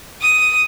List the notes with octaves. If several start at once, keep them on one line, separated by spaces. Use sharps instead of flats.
D#6